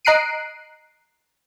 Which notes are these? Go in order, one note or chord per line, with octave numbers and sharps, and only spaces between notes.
D#5 A#5 F#6 C7 D7 D#7